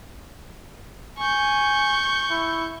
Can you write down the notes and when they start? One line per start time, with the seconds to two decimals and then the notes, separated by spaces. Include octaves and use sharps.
1.18 G#5 C#6 G6
2.31 E4